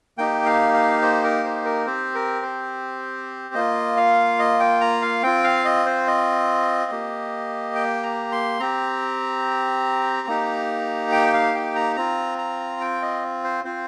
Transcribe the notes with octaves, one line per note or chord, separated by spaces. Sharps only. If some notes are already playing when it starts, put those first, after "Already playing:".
A#3 D#4 G4 G5
F5
F5
C5
A#4
C5
A#4
C4 G4 C5
A#4
C5
A#3 F4 D#5
F5
D#5
G5
A#5
F5
C4 F4 G5
F5
D#5
C5
D#5
A#3 G4
G5
A#5
C6
C4 G4 A#5
A#3 D#4 G4
G5
F5
G5
A#5
C4 F4 A#5
A#5
G5
D#5
C5
C4 F4 C5